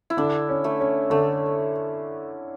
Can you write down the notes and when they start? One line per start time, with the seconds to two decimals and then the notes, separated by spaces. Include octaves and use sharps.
0.10 E4
0.17 D3 D4
0.49 C#4
0.64 A3
0.80 C#4
1.10 D3 A3